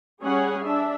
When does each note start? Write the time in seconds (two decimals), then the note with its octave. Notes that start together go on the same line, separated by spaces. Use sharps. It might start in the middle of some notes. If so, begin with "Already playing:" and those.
0.22 G3 C#4 G#4 C#5 F#5 G#5
0.65 D4 E5